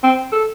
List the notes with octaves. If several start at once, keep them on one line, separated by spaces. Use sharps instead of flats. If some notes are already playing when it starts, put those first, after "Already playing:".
C4
A4